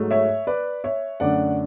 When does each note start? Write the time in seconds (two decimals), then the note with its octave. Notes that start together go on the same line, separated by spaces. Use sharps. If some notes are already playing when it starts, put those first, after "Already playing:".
Already playing: G#2 F#3 A3
0.11 C#5 E5
0.47 B4 D5
0.84 C#5 E5
1.20 F#2 D3 A3 D4 D5 F#5